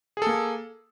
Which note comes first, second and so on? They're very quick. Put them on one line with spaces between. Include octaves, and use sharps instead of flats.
G#4 A4 A#3